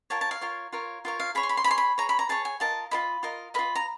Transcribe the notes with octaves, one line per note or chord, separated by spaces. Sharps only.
F4 A#4 C#5 A5
A5
F5
F4 A#4 C#5
F4 A#4 C#5
F4 A#4 C#5
F5
G#4 C#5 B5
C6
B5
C6
B5
G#4 C#5 C6
B5
G#4 C#5 A#5
B5
A#5
G#4 C#5 A5
G#5
F4 A#4 D#5 A5
F4 A#4 D#5 B5
F4 A#4 D#5
F4 A#4 D#5 B5
A#5